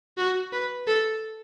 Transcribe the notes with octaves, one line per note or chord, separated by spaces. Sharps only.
F#4
B4
A4